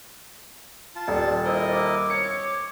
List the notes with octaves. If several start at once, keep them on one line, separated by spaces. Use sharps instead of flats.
F4 A5
D#1 D5
E4 A#4 C5 D#5
D6
C#5 C#7